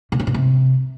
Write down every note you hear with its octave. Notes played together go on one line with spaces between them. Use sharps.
B2
C#3
A#2
C3